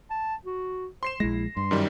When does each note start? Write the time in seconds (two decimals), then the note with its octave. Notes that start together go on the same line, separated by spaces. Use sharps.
0.10 A5
0.45 F#4
1.03 C5 C6 C7 E7
1.20 A#1 G#3 E4 A#6
1.57 G2 C6
1.71 F#2 D#3 G3